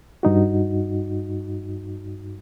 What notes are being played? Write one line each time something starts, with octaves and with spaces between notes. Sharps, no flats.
G2 D#4 F#4